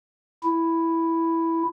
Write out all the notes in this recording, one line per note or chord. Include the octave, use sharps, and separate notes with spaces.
E4